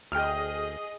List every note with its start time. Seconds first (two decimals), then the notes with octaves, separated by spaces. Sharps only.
0.12 D2 G#4 D#5 G5 F6